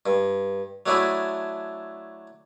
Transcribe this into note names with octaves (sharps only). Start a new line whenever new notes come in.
G2
F#3 A3 D4 E4 G#4